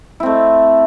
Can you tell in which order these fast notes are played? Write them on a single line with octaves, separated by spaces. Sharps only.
E4 C4 A3